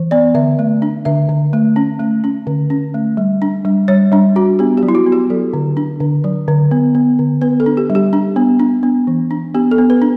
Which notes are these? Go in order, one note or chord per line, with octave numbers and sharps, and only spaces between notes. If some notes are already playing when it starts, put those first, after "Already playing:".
Already playing: E3
B3 D5
D3 E5
A3
D4
D3 E5
D3
A3
C#4
A3
C#4
D3
C#4
A3
G3
D4
G3
G3 C#5
G3 D4
D4 F#4
B3 G4
G4
F#3
E4
F#4
B3
G4
F#3 A4
D3
D4
D3
F#3
D3
B3
B3
D3
B3 B4
A4
D4
G4
G3
G4
D4
B3
D4
B3
E3
D4
B3 G4
A4
B3
B4
D4